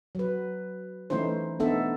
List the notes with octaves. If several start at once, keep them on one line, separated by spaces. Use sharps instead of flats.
F#3 B4
E3 A3 C#4 D#4 E4 C5
A3 B3 D4 D#4 A4 E5